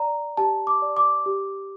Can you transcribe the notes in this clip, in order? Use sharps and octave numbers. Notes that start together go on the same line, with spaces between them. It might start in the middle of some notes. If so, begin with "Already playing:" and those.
Already playing: D5 A#5
G4 A5
D6
D5
D6
G4